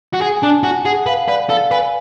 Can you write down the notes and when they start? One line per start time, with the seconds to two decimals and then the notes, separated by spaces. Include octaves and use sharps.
0.13 F#4
0.20 G#4 G#5
0.37 G#5
0.42 D4 A5
0.63 F#4 G#5
0.85 G#4 F#5
1.06 B4 F5
1.28 B4 D5
1.50 A4 F5
1.71 B4 G#5